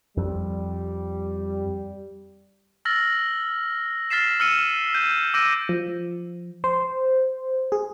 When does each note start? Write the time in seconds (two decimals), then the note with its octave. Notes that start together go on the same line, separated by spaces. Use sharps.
0.17 F2 G3
2.85 E6 F6 A6 A#6 F#7
4.10 F6 A6 B6 C7 E7
4.40 E6 F6 C#7 D#7 E7
4.95 G6 D#7
5.34 D6 E6 G6 A#6 D7 D#7
5.69 F3
6.64 C5
7.72 G#4